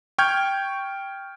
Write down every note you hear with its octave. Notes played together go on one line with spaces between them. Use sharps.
G5 C#6 F6 G6 G#6